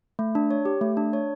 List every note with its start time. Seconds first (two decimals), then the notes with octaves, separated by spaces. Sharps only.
0.19 A3
0.35 D4
0.51 C#5
0.65 G4
0.81 A3
0.97 D4
1.13 C#5